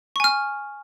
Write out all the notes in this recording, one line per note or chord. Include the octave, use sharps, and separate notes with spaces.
G#5 C#6 F6